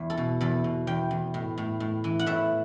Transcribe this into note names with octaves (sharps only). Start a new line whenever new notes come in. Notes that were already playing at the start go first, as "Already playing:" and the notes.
Already playing: E2 E5
A4
B2
E2 A4
B2
E2 G5
E2
A2
A2
A2
E3
F#5
A2 E5